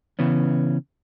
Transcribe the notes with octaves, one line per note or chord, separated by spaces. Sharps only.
C#3 E3 B3 C#4